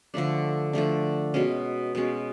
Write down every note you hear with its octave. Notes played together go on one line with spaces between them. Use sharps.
D3 F3 A3 D4
D3 F3 A3 D4
B2 G#3 C#4
B2 G#3 C#4